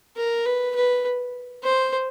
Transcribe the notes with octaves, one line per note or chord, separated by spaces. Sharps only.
A#4
B4
B4
C5